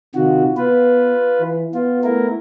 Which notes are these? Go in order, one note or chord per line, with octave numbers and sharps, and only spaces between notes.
C3 D#3 F4 F#4
B3 F4 B4
E3
B3 F4
A3 E4 A#4